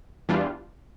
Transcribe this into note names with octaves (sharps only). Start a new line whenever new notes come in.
E2 E3 G3 D4 F4